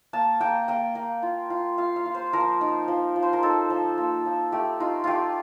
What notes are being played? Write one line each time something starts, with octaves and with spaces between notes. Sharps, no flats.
A#3 A5
A#3 G5
A#3 G5
A#3
F4
F4
F4 F5
F5
F4
C5
F3 A#4
D#4
F3
F3
C5
A#4
D#4 A4
F3
A#3
F3
A3 G4
D#4 F4
A3 F4 G4